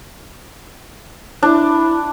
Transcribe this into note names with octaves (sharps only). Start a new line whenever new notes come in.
D4 E4